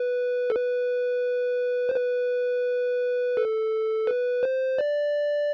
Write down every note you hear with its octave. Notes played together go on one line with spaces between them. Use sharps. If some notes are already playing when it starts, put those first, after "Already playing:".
Already playing: B4
A4
B4
C5
B4
A4
B4
C5
D5